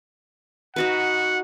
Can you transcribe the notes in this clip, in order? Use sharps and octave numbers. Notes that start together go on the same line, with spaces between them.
D#4 F#4 B4 F#5